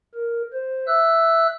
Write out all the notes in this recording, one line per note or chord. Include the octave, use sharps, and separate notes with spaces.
A#4
C5
E5 E6 F#6